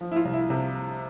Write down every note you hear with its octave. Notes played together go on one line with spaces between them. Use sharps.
F3
E4
F4
C2
E4
C3